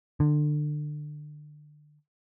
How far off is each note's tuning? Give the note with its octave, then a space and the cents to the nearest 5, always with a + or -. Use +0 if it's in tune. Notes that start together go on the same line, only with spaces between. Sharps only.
D3 +25